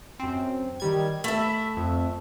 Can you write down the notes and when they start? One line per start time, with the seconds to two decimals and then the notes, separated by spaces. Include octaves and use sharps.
0.19 F#2 C4
0.80 D#3 G3 G#6
1.24 A3 E5 B5
1.77 F2